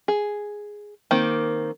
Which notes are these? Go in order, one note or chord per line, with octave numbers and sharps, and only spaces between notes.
G#4
D#3 A#3 C4